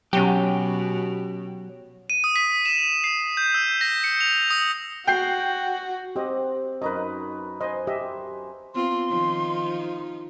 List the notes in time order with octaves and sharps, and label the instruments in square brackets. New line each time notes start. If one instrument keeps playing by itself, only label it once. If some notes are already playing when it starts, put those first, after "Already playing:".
[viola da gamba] B2 [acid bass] F#3 [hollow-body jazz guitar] C#4 G4
[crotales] D#7
D#6
B6
E7
C7
G6
E6
A#6
C#7
F7
D#6
[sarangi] F#4 [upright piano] G5 G6 C7
[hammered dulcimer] C4 [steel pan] G4 D#5
[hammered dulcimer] F#2 D#4 B4 [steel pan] A#4 D#5
[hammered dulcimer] C5 G#5 [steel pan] D#5
[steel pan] G4 D#5 E5
[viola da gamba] B3 C4 F4 [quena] C6
[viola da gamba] D#3 F3 D#4